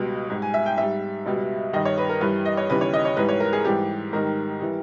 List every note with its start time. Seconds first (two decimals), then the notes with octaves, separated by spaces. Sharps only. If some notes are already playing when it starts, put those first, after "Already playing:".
Already playing: C#2 B2 G3
0.30 G#2 G3
0.42 G#5
0.54 E5
0.66 G5
0.77 G#2 G3 E5
1.26 C#2 B2 G3
1.73 G2 D#3 G3 D#5
1.85 C#5
1.98 B4
2.09 A#4
2.21 G2 E3 G3 B4
2.45 D#5
2.57 C#5
2.69 D#2 C#3 E3 G3 B4
2.81 C#5
2.93 D#5
3.05 C#5
3.17 G#2 E3 G3 B4
3.29 C#5
3.40 A#4
3.53 G#4
3.65 G#2 E3 G3 G4
4.13 G#2 D#3 G3 A#4
4.60 E3 G3